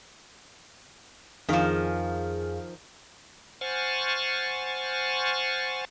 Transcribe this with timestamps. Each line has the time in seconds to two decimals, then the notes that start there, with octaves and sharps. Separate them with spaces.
1.49 F2 D#3 F3 G#4 F5
3.61 C5 F#5 G#5 C#6 F6 A6